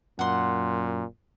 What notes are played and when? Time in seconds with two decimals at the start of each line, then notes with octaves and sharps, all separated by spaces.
0.19 F#2 A#2 F#5 C6